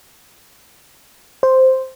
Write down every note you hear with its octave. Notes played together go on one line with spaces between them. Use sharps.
C5